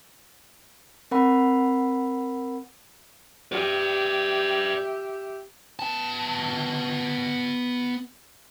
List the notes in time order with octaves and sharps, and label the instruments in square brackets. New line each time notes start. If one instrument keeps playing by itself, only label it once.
[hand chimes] C4 A#4 F#5 B5
[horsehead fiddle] G4 E5 [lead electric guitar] B4 D5
[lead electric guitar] B3 A5